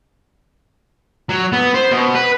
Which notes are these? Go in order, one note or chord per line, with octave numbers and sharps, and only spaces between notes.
F#3
B3
C5
B2
B4